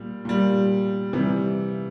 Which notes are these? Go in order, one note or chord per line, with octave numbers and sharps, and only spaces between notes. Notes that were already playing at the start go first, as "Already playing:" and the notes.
Already playing: A#2 G3
A#2 G3
C3 E3 G3